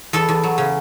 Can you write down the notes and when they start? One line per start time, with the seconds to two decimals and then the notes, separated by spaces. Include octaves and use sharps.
0.13 E2 A4
0.29 E2
0.43 F#3
0.58 C#3